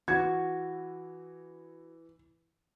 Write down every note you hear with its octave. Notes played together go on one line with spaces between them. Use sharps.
E3 F#4 G#6